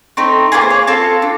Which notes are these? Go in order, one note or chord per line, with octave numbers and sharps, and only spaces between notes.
A3 C4 D#4
A#3 D4 F4 G#4 B4
C5
C#5
C4 F4 A4
D4